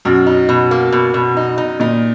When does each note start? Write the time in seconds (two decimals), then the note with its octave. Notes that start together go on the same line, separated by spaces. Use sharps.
0.05 F#2 B2
0.26 D#4
0.49 B2
0.71 A#3
0.92 B2
1.14 B2
1.37 D#4
1.58 D#4
1.80 A#2 D#4